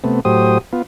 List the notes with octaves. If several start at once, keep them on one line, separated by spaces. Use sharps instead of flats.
C3 A3 B3
A2 F#3 G4 C5 D#6
B3 F4